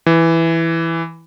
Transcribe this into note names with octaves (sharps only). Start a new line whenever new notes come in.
E3